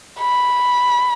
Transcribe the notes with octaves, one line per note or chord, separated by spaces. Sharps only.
B5